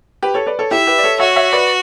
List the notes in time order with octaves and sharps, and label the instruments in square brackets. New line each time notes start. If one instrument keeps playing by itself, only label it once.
[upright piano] G4 B4
A4 C#5
B4 D5
A4 C#5
[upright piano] E4 G4 [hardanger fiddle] E5
[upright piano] G4 B4
D5
A4 C#5
[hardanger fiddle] F#4 [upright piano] C#5 E5
[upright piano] C#5 E5
B4 D5